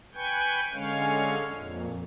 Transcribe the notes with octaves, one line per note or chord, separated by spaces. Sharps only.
B4 G5 G#5 C#6 G6
D3 G#3 C#4 C#5 F5
F2 A#2